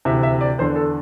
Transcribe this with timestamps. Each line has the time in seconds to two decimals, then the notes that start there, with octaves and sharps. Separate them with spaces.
0.05 D2 C3 E3 E5
0.23 E5
0.41 D5
0.58 E2 D3 C5
0.76 A4